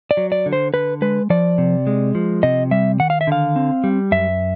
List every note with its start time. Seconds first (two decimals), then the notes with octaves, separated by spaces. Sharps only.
0.11 D5
0.17 F#3
0.32 D5
0.46 D3
0.53 C5
0.74 D3 B4
1.02 G#3 B4
1.30 F3 D5
1.58 C3
1.87 G#3
2.15 F3
2.43 C3 D#5
2.71 G3 E5
3.00 D#3 F#5
3.10 F5
3.21 E5
3.27 D3 F5
3.56 C4
3.84 G3
4.12 F#2 E5